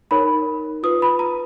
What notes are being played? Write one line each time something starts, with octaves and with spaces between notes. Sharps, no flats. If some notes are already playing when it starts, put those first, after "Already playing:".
D#4 A#4 C#5 B5
F4 B4 D#6
B5
A#5